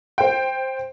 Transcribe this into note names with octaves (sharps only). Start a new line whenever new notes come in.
C5 G5